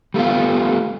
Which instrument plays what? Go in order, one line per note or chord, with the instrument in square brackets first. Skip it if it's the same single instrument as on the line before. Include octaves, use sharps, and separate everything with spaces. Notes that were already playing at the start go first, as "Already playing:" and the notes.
[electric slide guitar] G3 A3 B3 F4